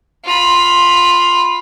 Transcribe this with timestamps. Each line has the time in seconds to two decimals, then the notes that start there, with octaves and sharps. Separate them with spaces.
0.25 F4 B5